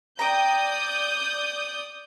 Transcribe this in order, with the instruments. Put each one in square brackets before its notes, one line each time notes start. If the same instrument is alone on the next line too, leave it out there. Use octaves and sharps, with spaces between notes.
[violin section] D5 D#6 G6 [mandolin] G5 A#5